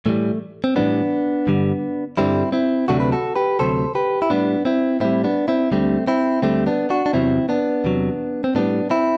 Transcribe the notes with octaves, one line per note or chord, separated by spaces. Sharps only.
A2 E3 G3 A3
C4
A2 E3 G3 B3 D4
G2 D3 G3
G2 D3 G3 C4 E4
C4 E4
D2 C3 F#3 A3 D4 F#4
B4
F#4 A4
G4 B4
D2 C3 F#3 A3 A4 C5
G4 B4
E4
A2 G3 B3 D4
C4 E4
A2 G3 C4 E4
B3 D4
C4 E4
D2 D3 G3 A3 C4
C4 E4
D2 D3 G3 A3 C4
B3 D4
D4 F#4
D4
E2 C3 F#3 C4 E4
B3 D4
E2 C3 F#3
C4
A2 G3 B3 D4
C4 E4